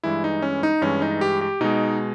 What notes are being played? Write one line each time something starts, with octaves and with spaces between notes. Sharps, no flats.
G2 E3 G#3 E4
D#4
C#4
D#4
G2 E3 G#3 C#4
D#4
G4
G4
B2 G#3 D#4